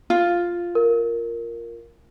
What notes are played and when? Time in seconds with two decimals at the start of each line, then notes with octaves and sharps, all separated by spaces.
0.10 F4
0.75 A#4